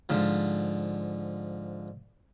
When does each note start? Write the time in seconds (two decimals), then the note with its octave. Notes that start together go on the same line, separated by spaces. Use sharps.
0.09 G#2 D3 F3